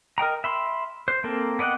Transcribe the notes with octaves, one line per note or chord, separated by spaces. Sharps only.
A#4 D#5 G5 A#5
E5 B5 C6
C5
A#3 C4 A4 A#4
B3 D5 D#5 F#5 G5